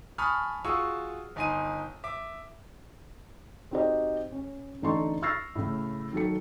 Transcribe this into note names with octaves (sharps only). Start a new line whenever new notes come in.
G#5 A5 B5 C#6 D#6 F6
F4 F#4 G#4 C#6 D#6 E6
G1 D#4 G#5 C6 D#7
E5 D6
C4 D#4 F#4 G4 C5 D#5
C#4
A1 D3 D#4 A4 C6 C#6
C#6 E6 F6 A6 A#6 C7
A2 C#3
D#3 F#3 A4 C#7